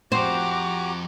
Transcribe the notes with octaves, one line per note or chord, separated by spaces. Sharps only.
F3 C4 F#4 G4 C5 A#5 D6